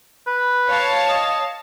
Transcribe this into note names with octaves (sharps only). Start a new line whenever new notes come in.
B4
C#5 F5 A5
D#5